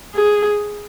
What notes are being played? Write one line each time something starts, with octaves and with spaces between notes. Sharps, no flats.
G#4